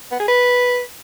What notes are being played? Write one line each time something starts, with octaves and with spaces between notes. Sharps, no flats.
B3
G#4
B4